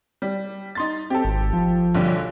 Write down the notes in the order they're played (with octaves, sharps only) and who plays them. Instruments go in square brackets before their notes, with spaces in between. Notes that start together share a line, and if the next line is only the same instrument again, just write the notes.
[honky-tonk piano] G3
D#4 C6 A6
[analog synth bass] C4 [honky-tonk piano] G4 A4
[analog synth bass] G#1
F3
[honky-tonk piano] B1 D3 G3